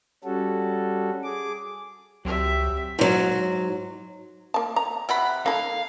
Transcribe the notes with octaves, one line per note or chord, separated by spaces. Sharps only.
G3 C#4 F#4 A4
G#4 D6
C#2 F#3 C4 G4 E5
G#2 F#3
A#3 A5
A#5
C3 F#5 B5
D#3 A#3 A4 F5